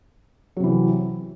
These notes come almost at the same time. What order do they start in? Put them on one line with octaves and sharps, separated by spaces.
F#3 C3 E3